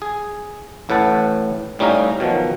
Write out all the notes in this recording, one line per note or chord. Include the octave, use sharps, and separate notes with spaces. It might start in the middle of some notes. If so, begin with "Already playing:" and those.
G#4
A1 A2 B4 F#5 A5
A2 G3 C#4 D#4 F5 A#5
B2 D#3 F3 F#3